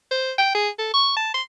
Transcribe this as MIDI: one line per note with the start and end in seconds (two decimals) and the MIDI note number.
0.11 0.32 72
0.38 0.50 79
0.54 0.69 68
0.79 0.93 69
0.94 1.13 85
1.16 1.33 81
1.34 1.42 84